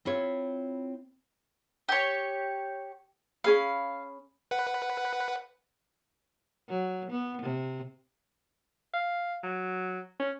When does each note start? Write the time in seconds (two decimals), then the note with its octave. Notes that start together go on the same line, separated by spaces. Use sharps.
0.05 C4 E4 F4 C#5
1.89 G4 C#5
3.44 C#4 G#4 F5 B5
4.51 B4 F#5
6.69 F#3
7.11 B3
7.42 C3
8.94 F5
9.43 F#3
10.19 C#4